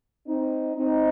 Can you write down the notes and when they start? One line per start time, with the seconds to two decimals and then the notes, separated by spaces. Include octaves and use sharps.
0.27 C4 D#4
0.75 C4 D#4